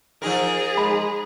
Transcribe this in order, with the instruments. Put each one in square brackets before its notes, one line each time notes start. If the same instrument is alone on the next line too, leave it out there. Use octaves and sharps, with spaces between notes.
[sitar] F3 D#4 A#4 [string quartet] G#4
[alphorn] G#3 [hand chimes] B5